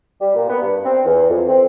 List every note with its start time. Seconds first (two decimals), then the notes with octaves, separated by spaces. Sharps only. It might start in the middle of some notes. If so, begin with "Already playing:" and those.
0.21 G3
0.35 A#2
0.49 B3
0.62 G2
0.84 C4
1.06 E2
1.30 F2
1.49 C4